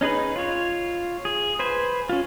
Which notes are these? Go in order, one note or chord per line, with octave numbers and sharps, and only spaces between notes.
C#4 D#4 G#4 B4
F4 C#5
G#4
B4 C5 G#5
C#4 F4